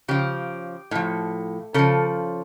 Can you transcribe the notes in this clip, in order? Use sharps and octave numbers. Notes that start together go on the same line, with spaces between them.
C#3 F3 G4
A2 F3
C#3 F3 A4